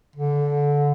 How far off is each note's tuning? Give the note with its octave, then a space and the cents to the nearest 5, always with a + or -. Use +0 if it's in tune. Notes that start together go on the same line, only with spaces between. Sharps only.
D3 -20